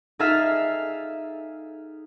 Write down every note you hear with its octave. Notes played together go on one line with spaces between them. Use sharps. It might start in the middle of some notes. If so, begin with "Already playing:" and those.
D#4 G#4 A4 E5 F5 F6